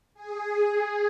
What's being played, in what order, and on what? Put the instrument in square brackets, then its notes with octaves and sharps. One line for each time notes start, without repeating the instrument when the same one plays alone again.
[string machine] G#4